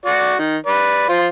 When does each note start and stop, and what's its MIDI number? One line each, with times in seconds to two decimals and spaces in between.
0.06 0.34 66
0.06 0.34 74
0.39 0.57 51
0.66 1.08 71
0.66 1.08 74
1.09 1.27 53
1.09 1.27 65
1.09 1.27 72